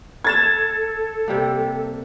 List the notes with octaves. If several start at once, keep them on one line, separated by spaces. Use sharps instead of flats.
A4 G#6 A6 E7
C3 G3 A#3